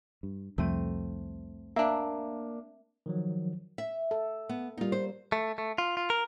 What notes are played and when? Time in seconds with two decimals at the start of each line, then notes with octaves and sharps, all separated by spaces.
0.23 G2
0.58 C2 F2 A3 C4 D#7
1.76 A#3 D4 E5
3.06 D#3 F3 F#3
3.78 E5
4.11 A4
4.49 B3
4.78 G3 A#3 D#4 F4
4.92 C5
5.32 A3
5.58 A3
5.78 F4
5.97 F4
6.10 A#4